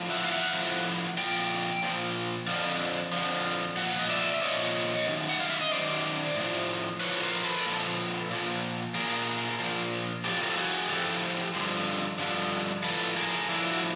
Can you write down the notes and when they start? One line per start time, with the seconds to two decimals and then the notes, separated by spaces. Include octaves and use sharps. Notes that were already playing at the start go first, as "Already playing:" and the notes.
Already playing: A2 F3
0.10 E5 F#5
0.26 F5
0.31 E5 F#5
0.53 A2 F3
1.18 A#2 F3 G5
1.83 A#2 F3
2.48 F2 D3 F3
3.12 F2 D3 F3
3.77 A#2 F3 F#5
3.99 D#5
4.09 D5 E5
4.34 E5
4.41 A#2 F3 C#5 D#5
5.06 F#2 D#3
5.29 F#5
5.40 F5
5.50 E5
5.61 D#5
5.72 F#2 D#3 C5 D5
6.36 A2 F3
7.00 A2 F3 B4 C#5
7.22 A#4 C5
7.44 A4 B4
7.66 A#2 F3
8.30 A#2 F3
8.95 A#2 F3 G#4 A#4
9.60 A#2 F3
10.25 A2 F3 G4 A4
10.43 A#4
10.50 A4
10.57 F#4 G#4
10.89 A2 F3 G4 A4
11.54 G2 D3 F3
12.19 G2 D3 F3
12.83 A2 F3 A4 B4
13.16 G#4 A#4
13.49 A2 F3 D4 E4
13.71 F#4